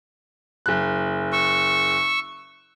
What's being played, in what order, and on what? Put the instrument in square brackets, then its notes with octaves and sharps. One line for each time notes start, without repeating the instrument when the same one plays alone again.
[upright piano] F#1 F#6
[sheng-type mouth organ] C#6 E6